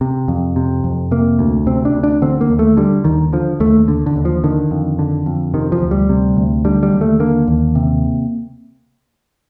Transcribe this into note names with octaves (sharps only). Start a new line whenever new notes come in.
C3
F2
C3
F2
C3 A#3
D2
C3 C4
D4
D2
D4
D3 C4
A#3
D#2
A3
D3 G3
D#2 D#3
D3 F3
D#2 A3
D3
D3
D#2
F3
D3 D#3
F2
D3
F2
C3 D#3
F3
D2
G3
C3
D2
D3 G3
G3
D#2
A3
D3 A#3
D#2
C3